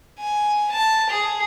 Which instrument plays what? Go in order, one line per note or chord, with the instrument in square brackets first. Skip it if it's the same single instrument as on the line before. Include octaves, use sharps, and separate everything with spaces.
[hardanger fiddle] G#5
A5
G#4